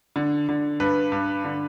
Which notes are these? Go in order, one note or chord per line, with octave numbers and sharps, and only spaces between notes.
D3
D3
G2 B4
G2
D3